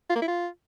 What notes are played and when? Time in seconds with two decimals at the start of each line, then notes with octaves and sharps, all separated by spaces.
0.10 F4
0.16 A#3
0.22 E4
0.28 F4